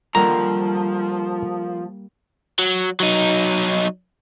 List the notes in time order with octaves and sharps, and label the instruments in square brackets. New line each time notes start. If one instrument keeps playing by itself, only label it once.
[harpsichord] D3 D#3 D4 [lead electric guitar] F3 [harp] G3 A#3 [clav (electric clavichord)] A#5
[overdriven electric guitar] F#3
F#3 D#4